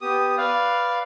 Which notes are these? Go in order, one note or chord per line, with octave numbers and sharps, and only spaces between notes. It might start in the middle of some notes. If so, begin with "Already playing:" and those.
B3 G4 D#6
B4 D5 F5